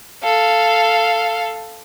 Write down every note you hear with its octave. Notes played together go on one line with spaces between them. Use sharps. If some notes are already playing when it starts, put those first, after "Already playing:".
A4 F5